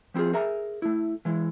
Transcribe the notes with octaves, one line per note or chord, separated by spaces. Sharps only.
F3 C4 E4 F4 G#4
G#4 A#4 E5 G#5 A#5
A3 E4
E3 G#3 E4